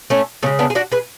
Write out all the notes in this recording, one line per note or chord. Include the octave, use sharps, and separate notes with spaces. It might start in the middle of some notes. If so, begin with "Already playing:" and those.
A3 C#4
C#3 G#3 A3 C#4
B3 D4
G#4
D4 F#4
G#4 B4